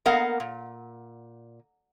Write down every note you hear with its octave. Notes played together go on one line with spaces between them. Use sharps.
A#3 B3 A#4 D#5 F5 F#5
A#2